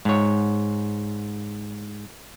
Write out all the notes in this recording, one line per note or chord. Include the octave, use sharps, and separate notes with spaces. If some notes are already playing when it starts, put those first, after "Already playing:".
G#2 C#5